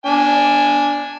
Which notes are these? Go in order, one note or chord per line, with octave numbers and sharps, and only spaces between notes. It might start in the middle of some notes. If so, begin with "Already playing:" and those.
D4 G#5